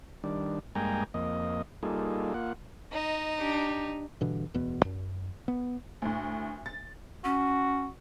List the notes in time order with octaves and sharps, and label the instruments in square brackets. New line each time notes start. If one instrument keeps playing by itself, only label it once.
[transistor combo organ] D#3 G3 D4
G2 G#3 A#3 G5 G#5 A#5
F2 A#3 D#5
G3 A#3 D#4 F4 G#4 A4
A#3 F4 F#5
[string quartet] D#4 [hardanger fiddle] D#5
[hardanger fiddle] D4 G4
[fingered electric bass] G2 B2 D3 E3
D1 E2 B2 B3
F#2
B3
[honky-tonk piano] D2 A2
A6
[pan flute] C#4 [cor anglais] F#4